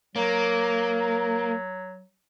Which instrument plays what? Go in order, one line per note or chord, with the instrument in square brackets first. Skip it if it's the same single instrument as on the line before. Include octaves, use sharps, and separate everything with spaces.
[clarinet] F#3 [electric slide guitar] A#3